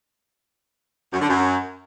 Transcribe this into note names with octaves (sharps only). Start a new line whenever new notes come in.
F#2
D3
F#2